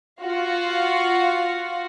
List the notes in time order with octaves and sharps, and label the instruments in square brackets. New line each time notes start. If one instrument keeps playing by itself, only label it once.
[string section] F4 F#4 F5